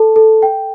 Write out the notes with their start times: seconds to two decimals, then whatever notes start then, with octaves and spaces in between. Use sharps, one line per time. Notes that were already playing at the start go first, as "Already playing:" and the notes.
Already playing: A4 A5
0.16 A4
0.43 G5